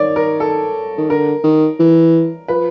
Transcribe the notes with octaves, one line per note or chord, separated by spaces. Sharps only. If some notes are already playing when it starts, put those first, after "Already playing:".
Already playing: D#3 C#5 D5
A#4
A4
D#3
D3 A#4
D#3
E3
F3 B4